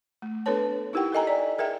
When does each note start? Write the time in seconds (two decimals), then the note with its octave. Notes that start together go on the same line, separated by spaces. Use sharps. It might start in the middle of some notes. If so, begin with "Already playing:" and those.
0.22 A3
0.46 B3 D4 A4 B4 C#5 A5
0.93 D#4 E4 G4 A#4 F#5 G5
1.12 A4 A#4 D#5 G#5 A#5
1.27 D5
1.59 G#4 A#4 E5 G5